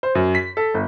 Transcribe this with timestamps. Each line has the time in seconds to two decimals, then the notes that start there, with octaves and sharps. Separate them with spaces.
0.03 C5
0.15 F#2
0.35 B6
0.57 A4
0.74 G1